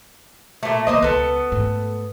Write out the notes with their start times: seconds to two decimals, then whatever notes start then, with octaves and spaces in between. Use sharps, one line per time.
0.63 A#2 A3
0.87 D#2 C#3 A#3 C5 D#5
1.02 C#2 B3 A4
1.52 G#2 A3